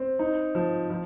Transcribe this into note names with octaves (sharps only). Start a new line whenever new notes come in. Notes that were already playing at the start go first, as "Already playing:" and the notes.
Already playing: C4
D#4
F3
F3